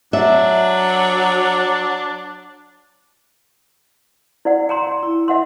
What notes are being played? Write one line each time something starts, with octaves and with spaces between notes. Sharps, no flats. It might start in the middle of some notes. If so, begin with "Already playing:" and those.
F#3 D4 E5
E4 D5 F#5
G5 A#5 C6
G5
E4
E5 F#5 C6